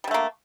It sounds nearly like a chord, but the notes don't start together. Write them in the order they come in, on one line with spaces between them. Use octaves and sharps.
G3 D3 A3 A#3